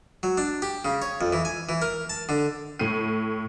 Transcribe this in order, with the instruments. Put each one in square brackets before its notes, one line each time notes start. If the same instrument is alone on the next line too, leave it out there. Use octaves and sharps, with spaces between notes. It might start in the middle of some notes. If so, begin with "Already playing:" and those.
[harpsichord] F#3
D4
G4
C#3
C#5
F2
E3
G#5
E3
A#4
A5
D3
[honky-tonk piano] A2 C7 D#7